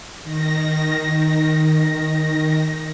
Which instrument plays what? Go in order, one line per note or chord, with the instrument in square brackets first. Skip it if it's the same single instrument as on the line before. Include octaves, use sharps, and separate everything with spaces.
[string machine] D#3 A#6